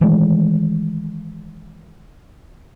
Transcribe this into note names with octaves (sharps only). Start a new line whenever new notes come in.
D#3 E3 G#3 A3